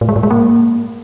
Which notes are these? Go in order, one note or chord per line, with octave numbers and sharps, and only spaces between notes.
A2
G#3
A2
G#3
A#3